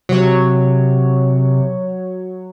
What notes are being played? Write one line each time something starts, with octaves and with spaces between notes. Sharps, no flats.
C3 F#3 C#5